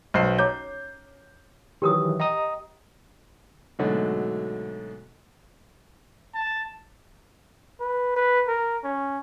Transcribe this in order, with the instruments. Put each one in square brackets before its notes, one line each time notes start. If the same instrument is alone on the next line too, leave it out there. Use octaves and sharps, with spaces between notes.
[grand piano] B1 C5 C7 [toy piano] C#4
[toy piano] C#5 A#5 D6 [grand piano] G6
[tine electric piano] D#3 E3 F#3 [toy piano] G4 A#4 D#6
[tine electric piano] D#5 A#5 D#6 [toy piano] G5
[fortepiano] G#2 B2 D3 F#3 A3
[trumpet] A5
[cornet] B4
B4
A#4
C#4